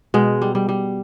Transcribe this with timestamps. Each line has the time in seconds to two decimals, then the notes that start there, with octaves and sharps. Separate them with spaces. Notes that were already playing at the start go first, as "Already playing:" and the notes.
0.14 B2 G#3
0.42 G3
0.55 G3
0.69 G3